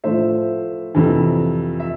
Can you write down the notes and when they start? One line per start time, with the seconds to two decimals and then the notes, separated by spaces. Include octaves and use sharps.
0.04 A2 F3 C5 E5
0.95 F2 C3 E3
1.80 E5